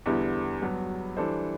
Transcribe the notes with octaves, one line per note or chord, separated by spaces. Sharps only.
E2 D3 G3 B3 E4
G2 F#3 B3
E3 G3 D4 A4 C5